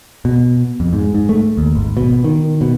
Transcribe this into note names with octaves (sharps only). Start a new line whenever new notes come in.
B2
F2
G#2
G#2
A3
D#2
G#1
B2
D#3
B2